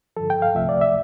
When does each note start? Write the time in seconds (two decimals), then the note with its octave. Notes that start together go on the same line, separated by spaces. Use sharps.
0.17 G2 D3 F3 A4
0.30 G5
0.42 F5
0.55 C2 C3 F3 A3 E5
0.69 D5
0.81 E5